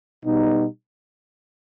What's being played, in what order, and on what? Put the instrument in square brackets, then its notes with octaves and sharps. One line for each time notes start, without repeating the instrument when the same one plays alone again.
[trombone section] B2 G3 B3 D#4